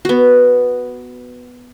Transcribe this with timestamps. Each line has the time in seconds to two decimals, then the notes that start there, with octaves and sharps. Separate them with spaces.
0.05 B3 F#4